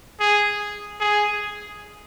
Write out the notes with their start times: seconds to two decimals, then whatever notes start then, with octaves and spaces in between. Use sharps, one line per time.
0.20 G#4
1.00 G#4